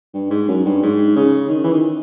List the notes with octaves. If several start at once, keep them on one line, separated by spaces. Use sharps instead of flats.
G2
G#2
F#2
G2
G#2
C#3
D#3
E3
D#3